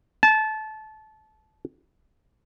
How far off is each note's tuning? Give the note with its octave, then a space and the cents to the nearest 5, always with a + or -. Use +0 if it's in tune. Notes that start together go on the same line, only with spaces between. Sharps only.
A5 -20